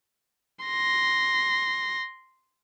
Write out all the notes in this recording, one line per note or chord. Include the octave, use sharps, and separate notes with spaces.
C6 A#6